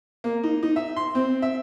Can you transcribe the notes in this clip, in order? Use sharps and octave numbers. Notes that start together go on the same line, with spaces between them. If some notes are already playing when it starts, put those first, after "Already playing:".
A#3
D#4
D#4
E5
C6
C4
E5